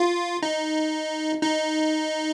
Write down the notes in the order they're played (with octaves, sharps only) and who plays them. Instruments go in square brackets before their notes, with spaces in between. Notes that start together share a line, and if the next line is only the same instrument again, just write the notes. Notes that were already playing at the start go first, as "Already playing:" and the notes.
Already playing: [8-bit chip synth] F4
D#4
D#4